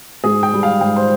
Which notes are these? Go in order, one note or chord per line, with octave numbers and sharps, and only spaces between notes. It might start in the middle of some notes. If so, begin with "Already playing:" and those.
G#2 G#4
G5
G3
F5
G#2 G5
C5